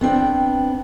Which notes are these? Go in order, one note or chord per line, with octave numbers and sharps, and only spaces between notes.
B3 C4 D4 G5